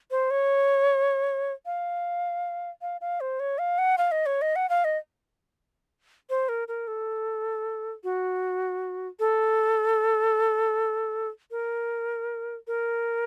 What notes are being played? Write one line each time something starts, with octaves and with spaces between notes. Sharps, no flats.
C5
C#5
F5
F5
F5
C5
C#5
F5
F#5
F5
D#5
C#5
D#5
F#5
F5
D#5
C5
A#4
A#4
A4
F#4
A4
A#4
A#4